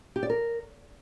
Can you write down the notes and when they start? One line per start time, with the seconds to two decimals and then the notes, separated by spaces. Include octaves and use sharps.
0.16 G4
0.23 D5
0.30 A#4